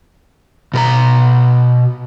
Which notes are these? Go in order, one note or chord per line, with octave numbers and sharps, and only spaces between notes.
B2 A#4 A#5